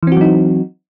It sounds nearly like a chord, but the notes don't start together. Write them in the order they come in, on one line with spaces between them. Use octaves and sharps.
E3 C4 F#4 F#3 D#4